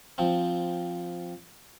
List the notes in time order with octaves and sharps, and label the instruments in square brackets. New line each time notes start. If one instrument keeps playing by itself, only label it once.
[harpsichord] F3 C4